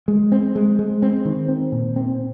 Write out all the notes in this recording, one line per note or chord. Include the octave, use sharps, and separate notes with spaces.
G#3
C4
G#3
G#3
C4
D#3
C4
A#2
C4